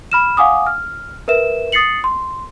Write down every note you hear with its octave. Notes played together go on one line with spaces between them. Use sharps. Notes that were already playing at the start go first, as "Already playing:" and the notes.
B5 F6 E7
F5 F#5 G#5 D6 D#6
F6
A#4 B4 E5 E7
D#6 A6 C7 C#7 F#7
C6